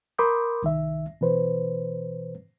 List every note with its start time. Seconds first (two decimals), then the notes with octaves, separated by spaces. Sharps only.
0.19 A#4 B5 C6 D6 D#6 G6
0.63 C2 D#3 E5
1.21 B2 E3 B4 C5